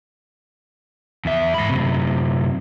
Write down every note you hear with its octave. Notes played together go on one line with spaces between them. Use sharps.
E2 E5
G#2 B5
F#2 C3